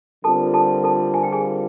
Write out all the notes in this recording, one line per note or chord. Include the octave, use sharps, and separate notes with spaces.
D3 G3 C4 F4 A4 A#4 A5
A4 A5
A4 A5
G#5
G5
G#4 G#5